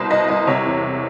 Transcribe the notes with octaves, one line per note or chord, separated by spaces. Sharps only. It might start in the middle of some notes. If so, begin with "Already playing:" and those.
Already playing: C2 B2 C5
C2 D#5
C2 D#5
C3 C#5
E2